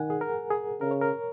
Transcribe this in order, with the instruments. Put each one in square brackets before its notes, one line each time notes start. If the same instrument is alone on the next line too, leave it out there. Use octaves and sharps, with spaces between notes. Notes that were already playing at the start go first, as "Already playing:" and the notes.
Already playing: [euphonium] D#3 [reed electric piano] F#5 G#5
[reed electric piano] G#4
A#4
G#4
[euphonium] C#3 [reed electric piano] A#4
[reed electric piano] C#5
A#4